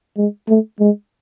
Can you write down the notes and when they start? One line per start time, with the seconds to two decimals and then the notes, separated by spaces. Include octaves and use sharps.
0.17 G#3
0.49 A3
0.80 G#3